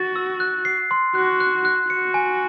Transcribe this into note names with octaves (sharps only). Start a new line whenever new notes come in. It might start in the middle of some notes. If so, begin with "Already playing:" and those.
Already playing: F#4 A6
E6
F#6
C7
C6
F#4 F#6
F#6
F#6
F#4 C#7
G#5